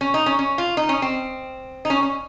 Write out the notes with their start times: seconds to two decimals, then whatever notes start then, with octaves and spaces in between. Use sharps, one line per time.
0.01 C#4
0.14 D#4
0.26 C#4
0.39 C#4
0.58 F4
0.77 D#4
0.89 C#4
1.02 C4
1.85 D#4
1.90 C#4
2.03 C#4